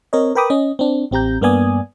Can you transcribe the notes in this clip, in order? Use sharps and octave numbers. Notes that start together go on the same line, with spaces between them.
C4 A#4 C#5 D#5
A#4 B4 G5 B5 D6 D#6
C#4 D#5
C4 D4
A1 C4 G4 A#5 G6
G2 A#3 B3 D5 G#5 D#6